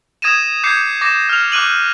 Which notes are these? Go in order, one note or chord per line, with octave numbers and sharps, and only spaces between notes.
D#6 G#6 A#6 D#7 E7
D6 G6 G#6 C7 C#7
D6 A#6 E7
F6 F7
D6 F#6 D#7 F#7